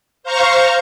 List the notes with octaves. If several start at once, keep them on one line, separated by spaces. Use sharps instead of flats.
C5 F5 A#5 C#6